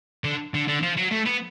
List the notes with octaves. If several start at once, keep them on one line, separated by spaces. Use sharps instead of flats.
D3
D3
D3
F3
F#3
A3
B3